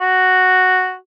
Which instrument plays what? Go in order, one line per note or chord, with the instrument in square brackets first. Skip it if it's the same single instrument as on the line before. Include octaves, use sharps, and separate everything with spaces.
[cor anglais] F#4